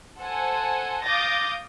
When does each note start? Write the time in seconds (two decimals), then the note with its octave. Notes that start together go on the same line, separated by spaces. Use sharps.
0.19 A4 C5 F#5 G#5
1.04 F5 D6 D#6 G6 A6 A#6